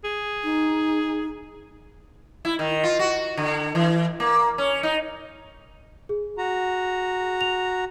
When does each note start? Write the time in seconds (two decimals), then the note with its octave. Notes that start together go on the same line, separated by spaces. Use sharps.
0.04 G#4
0.44 D#4
2.45 E4
2.59 D#3
2.84 F4
2.99 F#4
3.37 D3
3.75 E3
4.20 A#3
4.58 C#4
4.83 D#4
6.09 G#4
6.38 F#4 A#5
7.41 F7